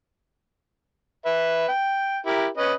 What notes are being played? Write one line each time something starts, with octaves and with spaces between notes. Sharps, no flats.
B4 E5
G5
E4 G4 A#4
C#4 B4 D#5